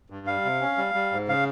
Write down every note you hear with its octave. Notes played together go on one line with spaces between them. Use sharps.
G2
G3 F5
C3
C#4
G3
G3
G#2
C#3 F5